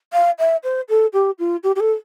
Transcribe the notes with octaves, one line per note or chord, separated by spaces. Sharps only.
F5
E5
C5
A4
G4
F4
G4
G4
A4